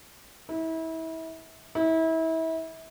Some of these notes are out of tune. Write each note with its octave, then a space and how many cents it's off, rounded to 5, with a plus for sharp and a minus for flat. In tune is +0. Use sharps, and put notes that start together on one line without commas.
E4 -30
E4 -30